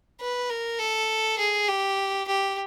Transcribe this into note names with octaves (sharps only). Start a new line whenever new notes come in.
B4
A#4
A4
G#4
G4
G4